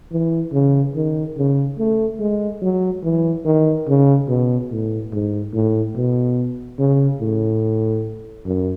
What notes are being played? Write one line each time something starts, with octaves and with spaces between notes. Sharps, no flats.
E3
C#3
D#3
C#3
A3
G#3
F#3
E3
D#3
C#3
B2
A2
G#2
A2
B2
C#3
A2
F#2